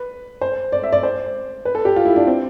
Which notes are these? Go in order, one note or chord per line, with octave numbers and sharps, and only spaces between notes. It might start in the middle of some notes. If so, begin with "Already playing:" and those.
Already playing: B4
C5
D5
E5
D5
C5
B4
A4
G4
F4
E4
D4
C4